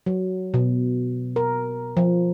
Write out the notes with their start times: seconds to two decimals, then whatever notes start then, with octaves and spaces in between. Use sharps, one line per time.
0.06 F#3
0.54 B2
1.36 A#4
1.97 F3